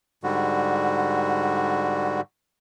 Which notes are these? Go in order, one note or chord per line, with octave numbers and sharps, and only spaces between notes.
G#2 D3 G3 F#4